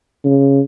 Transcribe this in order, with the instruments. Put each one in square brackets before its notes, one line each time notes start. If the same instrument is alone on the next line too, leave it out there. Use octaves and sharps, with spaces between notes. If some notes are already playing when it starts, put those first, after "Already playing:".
[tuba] C#3